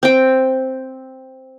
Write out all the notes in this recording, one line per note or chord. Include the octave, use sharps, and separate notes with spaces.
C4 G5